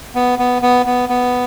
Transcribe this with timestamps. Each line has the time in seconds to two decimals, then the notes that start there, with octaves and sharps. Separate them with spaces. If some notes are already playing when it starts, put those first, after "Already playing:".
0.15 B3
0.39 B3
0.62 B3
0.86 B3
1.09 B3